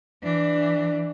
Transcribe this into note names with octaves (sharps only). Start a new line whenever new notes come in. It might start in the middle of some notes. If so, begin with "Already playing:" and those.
E3 D4